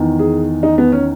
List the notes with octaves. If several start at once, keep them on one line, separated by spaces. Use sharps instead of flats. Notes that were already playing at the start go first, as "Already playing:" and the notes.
Already playing: E2 D#3
G#4
D#4
B3
C#4